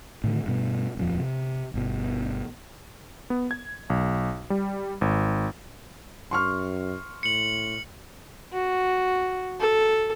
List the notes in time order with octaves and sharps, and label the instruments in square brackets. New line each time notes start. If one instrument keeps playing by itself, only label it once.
[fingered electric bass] A2 D3 D#3
G2 B2
D#1 F2 F3
C3
G1 B2
[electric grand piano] B3
G#6
B1
G3
G#1
[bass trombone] F#2 [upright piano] C6 C#6 F6
[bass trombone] A2 [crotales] C#7 F#7
[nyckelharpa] F#4
A4